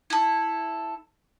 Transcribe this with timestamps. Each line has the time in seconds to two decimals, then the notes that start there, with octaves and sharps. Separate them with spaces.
0.10 E4 A4